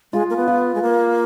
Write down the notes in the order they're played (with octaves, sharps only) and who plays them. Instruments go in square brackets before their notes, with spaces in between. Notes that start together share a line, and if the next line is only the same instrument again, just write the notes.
[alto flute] G#3 [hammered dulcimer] F4
[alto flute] A#3
B3
[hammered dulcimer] F4
[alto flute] G#3
A#3